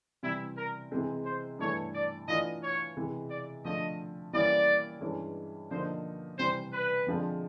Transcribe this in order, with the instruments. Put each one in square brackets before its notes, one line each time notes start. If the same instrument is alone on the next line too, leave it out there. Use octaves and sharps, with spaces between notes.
[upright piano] C3 E3 G3 C4 [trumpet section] E4
[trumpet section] A#4
[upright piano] C3 E3 G#3 C4
[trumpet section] C5
[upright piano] G2 E3 A3 [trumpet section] C#5
[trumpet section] D5
[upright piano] E3 A3 D4 F4 [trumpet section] D#5
[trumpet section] C#5
[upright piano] C3 E3 G#3
[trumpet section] D5
[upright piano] D3 F3 A3 [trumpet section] D#5
[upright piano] E3 G3 A#3 C#4 E4 [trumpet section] D5
[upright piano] G2 E3 G#3 C#4
[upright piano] D3 F3 A#3 D#4 [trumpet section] C5
[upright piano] C3 E3 G3 [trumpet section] C5
[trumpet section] B4
[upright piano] F2 D3 F3 G#3 C4